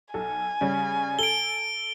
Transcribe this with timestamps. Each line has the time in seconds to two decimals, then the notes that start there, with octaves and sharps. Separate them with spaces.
0.14 B1 A4 G#5
0.61 C#3 G3 C#4
1.19 A4 D7 G7